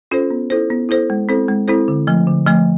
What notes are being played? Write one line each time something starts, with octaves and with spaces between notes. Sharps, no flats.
C#4 F4 A4 C5
B3
E4 A4 C5
B3
E4 A4 C5
G#3
C4 E4 A4 C5
G#3
C4 E4 A4 C5
D3
F3 A3
D3
F3 A3